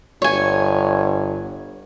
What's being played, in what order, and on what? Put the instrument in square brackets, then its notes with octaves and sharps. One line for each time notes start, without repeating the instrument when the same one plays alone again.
[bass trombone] G1 [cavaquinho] C#5 G#5